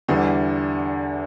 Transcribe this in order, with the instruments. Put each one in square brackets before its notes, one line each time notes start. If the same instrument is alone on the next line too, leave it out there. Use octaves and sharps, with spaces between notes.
[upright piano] E2 E3 G3 [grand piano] D3